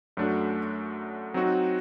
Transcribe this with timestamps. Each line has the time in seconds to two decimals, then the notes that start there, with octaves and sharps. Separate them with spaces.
0.17 F#2 F#3 A3 D4 F#4
1.34 F#3 C4 D#4 F#4